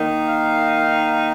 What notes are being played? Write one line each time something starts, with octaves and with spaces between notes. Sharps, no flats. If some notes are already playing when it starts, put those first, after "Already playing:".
Already playing: D#3 A#3 D#4
F5